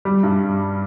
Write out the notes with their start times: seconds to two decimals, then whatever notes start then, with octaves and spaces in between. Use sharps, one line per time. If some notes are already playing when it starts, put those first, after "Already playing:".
0.05 G3
0.23 G2